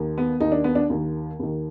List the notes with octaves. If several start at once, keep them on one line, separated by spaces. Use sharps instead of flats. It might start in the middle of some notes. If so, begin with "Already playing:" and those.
Already playing: D#2 D#3
B3
D#2 D#3 D#4
D4
B3
D4
D#2 D#3
D#2 D#3